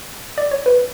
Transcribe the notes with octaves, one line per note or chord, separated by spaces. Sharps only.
D5
C#5
B4